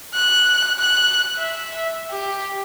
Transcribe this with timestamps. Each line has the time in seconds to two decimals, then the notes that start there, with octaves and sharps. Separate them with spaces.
0.14 F#6
0.79 F#6
1.37 E5
2.11 G4